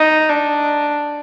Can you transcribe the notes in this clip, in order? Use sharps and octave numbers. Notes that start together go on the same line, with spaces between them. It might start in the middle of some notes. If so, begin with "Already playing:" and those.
Already playing: D#4
D4